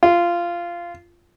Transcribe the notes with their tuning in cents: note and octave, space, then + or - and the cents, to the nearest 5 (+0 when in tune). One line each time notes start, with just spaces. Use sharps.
F4 -15